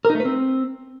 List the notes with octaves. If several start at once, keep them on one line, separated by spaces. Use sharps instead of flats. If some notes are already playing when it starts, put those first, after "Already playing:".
A#4
D#4
A3
B4
C4